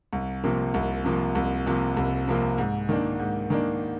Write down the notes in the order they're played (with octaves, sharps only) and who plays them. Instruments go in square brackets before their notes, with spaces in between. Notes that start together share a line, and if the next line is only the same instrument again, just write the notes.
[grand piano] C2
C3 F3 A#3
C2
C3 F3 A#3
C2
C3 F3 A#3
C2
C3 F3 A#3
G#2
D#3 A#3 D4
G#2
D#3 A#3 D4